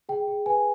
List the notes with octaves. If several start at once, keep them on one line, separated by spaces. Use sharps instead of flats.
G#4 G5
G#4
B4 G#5